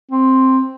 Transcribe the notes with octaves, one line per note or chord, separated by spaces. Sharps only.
C4